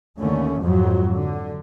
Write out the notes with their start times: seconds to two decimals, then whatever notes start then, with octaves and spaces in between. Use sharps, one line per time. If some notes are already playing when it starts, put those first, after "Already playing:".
0.18 D#2 D3 A3 C#4
0.61 F2 G#2 F3 F#3
1.13 D3